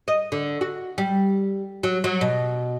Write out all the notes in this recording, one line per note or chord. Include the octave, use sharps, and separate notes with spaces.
D#5
D3
F#4
G3
F#3
F#3
B2